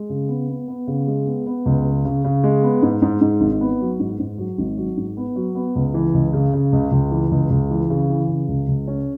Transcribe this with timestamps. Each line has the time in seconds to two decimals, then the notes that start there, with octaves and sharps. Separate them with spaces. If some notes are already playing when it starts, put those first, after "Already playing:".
Already playing: G#3
0.09 C#3
0.28 B3
0.49 B3
0.68 B3
0.87 C#3
1.08 G#3
1.26 B3
1.46 B3
1.66 C#2
1.85 C#3
2.05 C#3
2.24 C#3
2.44 G#3
2.63 B3
2.82 G#2
3.02 G#2
3.21 G#2
3.41 G#1
3.61 B3
3.80 F#3
4.00 G#2
4.20 G#2
4.38 F#3
4.58 G#1
4.77 F#3
4.97 G#2
5.17 B3
5.36 F#3
5.55 B3
5.76 C#2
5.94 E3
6.14 C#2
6.33 C#3
6.53 C#3
6.73 C#2
6.92 C#2
7.11 E3
7.31 C#2
7.50 C#2
7.71 E3
7.90 C#3
8.09 E3
8.28 C#3
8.48 C#2
8.68 C#2
8.87 C#4